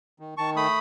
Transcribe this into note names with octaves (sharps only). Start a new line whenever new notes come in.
D#3
D#3 A5 C#6
A3 B5 D#6